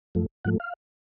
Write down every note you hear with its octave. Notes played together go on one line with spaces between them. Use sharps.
F#2 F3 A3
G#2 F3 A3 F#5
F5